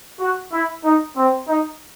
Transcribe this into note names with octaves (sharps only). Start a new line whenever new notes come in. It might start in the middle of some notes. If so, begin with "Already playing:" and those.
F#4
E4
D#4
C4
D#4